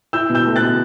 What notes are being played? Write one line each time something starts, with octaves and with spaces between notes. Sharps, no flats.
E4 E6 G6
B2
E6 G6
A3
F#6 A6
B2